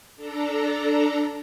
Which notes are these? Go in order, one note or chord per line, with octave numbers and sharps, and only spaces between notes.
D4 A4 A#5